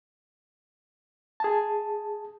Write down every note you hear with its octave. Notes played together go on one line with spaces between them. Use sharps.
G#4 A5